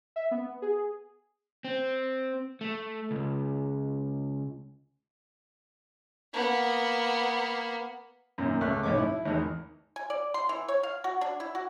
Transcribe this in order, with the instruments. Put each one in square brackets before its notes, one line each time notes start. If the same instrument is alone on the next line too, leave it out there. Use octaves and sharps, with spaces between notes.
[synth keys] E5
B3
G#4
[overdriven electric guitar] C4
A3
C#2
[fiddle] A#3 B3
[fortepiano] F#2 A#2 D#3
C#2 A3 C#6 F#6
B1 F2 C#5 D#5 D6
E4
G#1 E2 D#4
[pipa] G#5
D5
C6
E3
C#5
F5
F#4
D4
E4
F#4